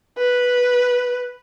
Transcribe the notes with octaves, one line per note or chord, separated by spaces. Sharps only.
B4